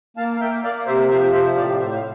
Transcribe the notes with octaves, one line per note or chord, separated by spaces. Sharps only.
A#3 F5 A5
F5
A#3 E5 G5
A#3 D5 F5
C3 C5 E5
F3 C5 E5
C3 C5 E5
A2 D5 F5
A2 C5 E5
F5